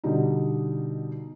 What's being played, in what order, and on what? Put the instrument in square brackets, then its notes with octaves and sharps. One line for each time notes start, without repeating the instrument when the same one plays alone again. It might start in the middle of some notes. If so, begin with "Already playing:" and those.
[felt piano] B2 D3 G3 D#4